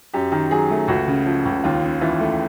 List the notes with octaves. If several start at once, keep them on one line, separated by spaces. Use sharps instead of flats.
F#2 G4
D#3
F#3 G#4
A3
C#2 F#4
C#3
F3
C#2
D#2 F4
C#3
E3 F4
A3